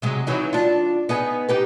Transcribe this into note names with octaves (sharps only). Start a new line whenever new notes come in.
C3 F#3 G#3
E3 F#3 D#4
D4 F4
B3 D#4 G#4
D#4 G4 B4